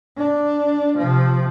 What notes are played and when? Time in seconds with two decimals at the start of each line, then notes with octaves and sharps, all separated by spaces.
0.17 D4
0.98 C3 F3